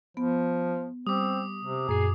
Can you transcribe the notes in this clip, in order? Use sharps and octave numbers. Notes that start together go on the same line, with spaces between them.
F3 B3
G3 C4 D6 D#6
C3
F#2 A#2 G#4 C7